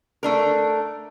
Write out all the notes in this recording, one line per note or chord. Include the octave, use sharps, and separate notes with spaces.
A3 D4 A#4